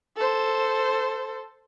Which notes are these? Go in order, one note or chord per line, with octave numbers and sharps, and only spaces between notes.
A4 C5